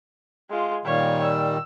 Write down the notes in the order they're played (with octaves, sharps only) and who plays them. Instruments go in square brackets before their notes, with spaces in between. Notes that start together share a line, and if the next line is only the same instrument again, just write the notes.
[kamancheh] G#3 F4
[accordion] A#2 D#3 G3 [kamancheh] C#5 F5
[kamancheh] E6